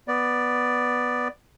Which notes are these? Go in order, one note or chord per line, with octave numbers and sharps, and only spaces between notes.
B3 D5